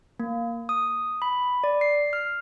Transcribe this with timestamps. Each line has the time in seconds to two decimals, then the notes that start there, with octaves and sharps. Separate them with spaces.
0.20 A#3
0.69 D#6
1.22 B5
1.64 D5
1.81 C7
2.13 F6